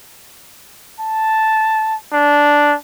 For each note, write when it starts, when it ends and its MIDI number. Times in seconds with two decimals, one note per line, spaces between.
1.00 1.95 81
2.13 2.75 62